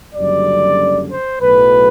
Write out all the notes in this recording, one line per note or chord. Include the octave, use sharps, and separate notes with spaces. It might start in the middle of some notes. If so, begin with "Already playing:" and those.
F#1 F#2 D3 G3 D5
C5
B1 A2 F#3 B4